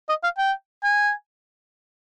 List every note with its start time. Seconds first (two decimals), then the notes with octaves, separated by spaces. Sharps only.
0.09 D#5
0.23 F5
0.38 G5
0.84 G#5